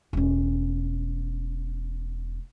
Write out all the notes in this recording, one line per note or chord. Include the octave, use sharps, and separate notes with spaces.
E1 C#4